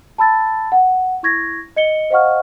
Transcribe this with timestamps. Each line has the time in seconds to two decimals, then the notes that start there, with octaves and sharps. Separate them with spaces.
0.18 A5 B5 E6 A6
0.72 F#5
1.23 E4 C#6 G#6 A#6
1.76 D#5 C#7 G7
2.10 C5 D#5 F5 F#5 C#6 F6